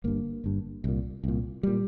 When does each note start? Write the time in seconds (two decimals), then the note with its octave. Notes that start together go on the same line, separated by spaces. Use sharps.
0.04 G1 G2 A#3
0.44 G1 G2
0.84 C2 A#2
1.24 C2 A#2
1.63 A#2 G3